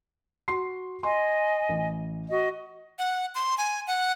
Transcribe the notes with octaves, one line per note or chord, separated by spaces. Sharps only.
F#4 C6 C7
D#5 G#5 C6
A1
F#4 D#5
F#5
C6
G#5
F#5